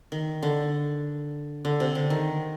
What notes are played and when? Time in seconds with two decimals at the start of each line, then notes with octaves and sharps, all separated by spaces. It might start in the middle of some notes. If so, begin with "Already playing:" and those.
0.12 D#3
0.43 D3
1.65 D3
1.80 C3
1.95 D3
2.10 D#3